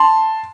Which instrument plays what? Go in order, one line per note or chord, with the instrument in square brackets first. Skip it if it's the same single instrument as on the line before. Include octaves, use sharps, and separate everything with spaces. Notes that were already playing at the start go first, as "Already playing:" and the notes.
Already playing: [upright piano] A5 C6